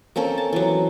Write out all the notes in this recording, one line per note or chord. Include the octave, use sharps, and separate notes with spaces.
A#3 C4 C#4 A4
A5
E3 F#3